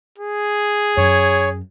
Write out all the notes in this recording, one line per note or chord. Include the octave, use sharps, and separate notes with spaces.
G#4
F#2 C#5